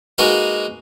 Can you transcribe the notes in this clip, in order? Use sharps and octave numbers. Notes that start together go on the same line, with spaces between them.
G#3 A#3 D#4 F#4 B4 F5